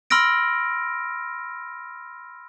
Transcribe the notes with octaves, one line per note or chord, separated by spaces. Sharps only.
B5 C6 E6 F6 A#6 D7